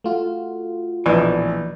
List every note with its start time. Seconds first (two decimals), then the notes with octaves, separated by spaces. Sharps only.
0.04 A3 F4 F#4
1.06 A#1 B2 E3